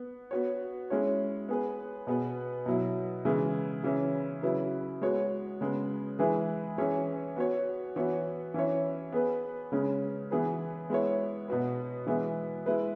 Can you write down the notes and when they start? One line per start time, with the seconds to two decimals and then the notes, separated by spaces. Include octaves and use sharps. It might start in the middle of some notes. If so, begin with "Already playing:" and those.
Already playing: B3
0.31 B3 F#4 C#5
0.90 G#3 C#4 E4 C#5
1.49 B3 G#4 B4
2.07 B2 B3 G#4 B4
2.66 B2 F#3 E4
3.25 C#3 E3 G#3
3.83 C#3 E3 C#4
4.43 C#3 F#3 E4 B4
5.02 G#3 B3 F#4 C#5
5.61 C#3 G#3 B3
6.19 E3 G#3 E4 G#4 B4
6.78 E3 C#4 G#4 C#5
7.36 B3 F#4 C#5
7.96 E3 B3 F#4 C#5
8.54 E3 C#4 E4 C#5
9.12 B3 G#4 B4
9.72 C#3 G#3 C#4
10.31 E3 B3 G#4 B4
10.90 G#3 B3 E4 C#5
11.48 B2 B3 F#4 B4
12.07 E3 G#3 B3 E4 G#4
12.66 G#3 E4 B4